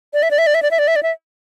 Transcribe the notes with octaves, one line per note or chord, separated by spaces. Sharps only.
D5
E5
D5
E5
D5
E5
D5
E5
D5
E5
D5
E5